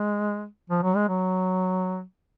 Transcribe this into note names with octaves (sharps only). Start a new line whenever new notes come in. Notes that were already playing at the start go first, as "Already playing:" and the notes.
Already playing: G#3
F3
F#3
G#3
F#3